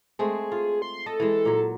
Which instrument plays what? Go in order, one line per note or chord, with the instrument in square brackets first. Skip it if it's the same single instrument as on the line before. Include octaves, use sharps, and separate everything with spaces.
[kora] G#3 A3 C4 [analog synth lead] G#4
[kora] F4
[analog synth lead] C6
[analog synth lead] A4 [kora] D#5
[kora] E3 G#3
A#2 F#3